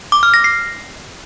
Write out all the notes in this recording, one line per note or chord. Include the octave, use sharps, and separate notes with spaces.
D6
F6
A#6
C7